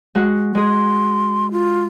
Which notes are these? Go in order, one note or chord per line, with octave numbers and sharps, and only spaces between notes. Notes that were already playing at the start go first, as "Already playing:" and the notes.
G#3 F#4 F#5
G#3 G#4 C6
F4